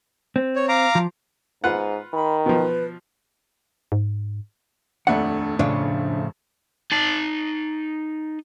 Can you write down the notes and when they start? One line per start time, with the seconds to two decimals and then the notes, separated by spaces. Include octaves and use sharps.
0.36 C4
0.56 C#5
0.69 F5 A#5 D6
0.95 F3
1.64 G#2 F4 B4 F#5
2.13 D#3 B5
2.46 B2 F3 B4
3.92 G#2
5.07 D#1 F2 A3 D4 F#5
5.59 A2 C#3 F3 D4 C#5 F5
6.92 D#4 A5